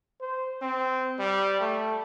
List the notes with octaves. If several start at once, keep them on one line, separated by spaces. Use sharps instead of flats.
C5
C4
G3
A3